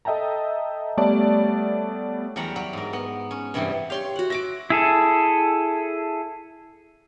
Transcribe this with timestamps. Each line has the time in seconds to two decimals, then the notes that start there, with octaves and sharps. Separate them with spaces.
0.05 A4 D#5 E5 G5 A5 A#5
0.97 G3 A3 B3 C#5 D5 A5
2.36 E2 F#3 G3 D5 F#5 A#5
2.56 F#3
2.73 G#2 A#4
2.93 B3
3.31 C#4
3.54 G2 C3 E3 G3 B3
3.90 G4 C#5 F5 C6 C#6
4.16 F#4 F#5
4.30 E5 D6 A#6 D7
4.70 E4 G#4 A4